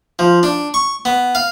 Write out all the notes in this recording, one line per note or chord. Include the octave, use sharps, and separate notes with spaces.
F3
D4
C#6
B3
F5